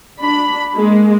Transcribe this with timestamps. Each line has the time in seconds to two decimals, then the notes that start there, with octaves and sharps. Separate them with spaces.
0.20 D4 B5
0.75 G#3 A#3